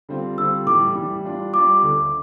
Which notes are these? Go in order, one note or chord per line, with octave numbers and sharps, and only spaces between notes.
D3 G3 C4 F4
D3 G3 C4 F4 E6
A2 E3 G3 D6
A2 E3 G3
G3 D4 F4
G3 D4 F4 D6
D2 D3 A3